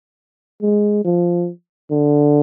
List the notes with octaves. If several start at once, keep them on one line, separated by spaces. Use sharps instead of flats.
G#3
F3
D3